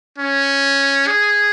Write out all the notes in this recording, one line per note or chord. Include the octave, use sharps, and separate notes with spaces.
C#4
G#4